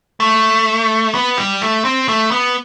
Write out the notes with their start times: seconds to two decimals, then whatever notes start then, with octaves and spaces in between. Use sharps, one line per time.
0.20 A3
1.15 B3
1.38 G3
1.62 A3
1.85 C4
2.09 A3
2.31 B3